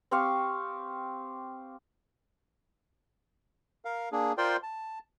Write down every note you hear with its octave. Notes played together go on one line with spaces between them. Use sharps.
C4 G4 F5 C#6
A#4 F5
A#3 D4 G#4
F4 A#4 C5 D5 G5 C6
A5